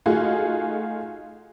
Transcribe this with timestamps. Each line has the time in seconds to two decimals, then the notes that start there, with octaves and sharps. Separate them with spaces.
0.06 A3 D#4 F4 F#4 G#4